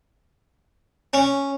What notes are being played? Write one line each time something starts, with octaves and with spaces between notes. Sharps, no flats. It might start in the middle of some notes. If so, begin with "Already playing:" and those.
C#4